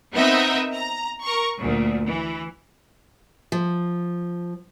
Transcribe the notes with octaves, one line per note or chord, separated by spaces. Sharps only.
B3 C4 D#4 A#4 D#5 E5
A#5
A#4 C#6
D2 A#2
E3
F3